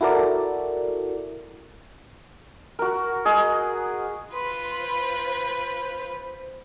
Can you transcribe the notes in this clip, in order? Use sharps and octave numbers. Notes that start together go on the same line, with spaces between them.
E4 F#4 A4 A#4 D5
F#4 A#4
G#4 D#5
F4 B4 C6
C5